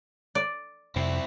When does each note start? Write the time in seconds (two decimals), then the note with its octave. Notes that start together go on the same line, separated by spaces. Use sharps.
0.35 D5
0.96 F2 C3 C4 E4